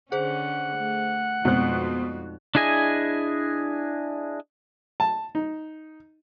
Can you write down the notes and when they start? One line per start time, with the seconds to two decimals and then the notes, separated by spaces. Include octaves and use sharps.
0.12 D3 C#4 G#4 C5 F#5
0.77 A3
1.45 F2 B2 G#3 C4 D#4 F#4 F#6
2.55 D4 E4 G#4 D#5 G#5
5.00 A5
5.35 D#4